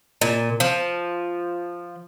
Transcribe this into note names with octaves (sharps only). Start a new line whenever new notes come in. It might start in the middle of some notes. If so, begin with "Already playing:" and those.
A#2
F3